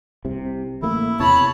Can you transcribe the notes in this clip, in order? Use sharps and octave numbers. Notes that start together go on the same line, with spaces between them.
C2 C3
A1 A3 A#3 E4
E2 C3 E3 C#5 A5 B5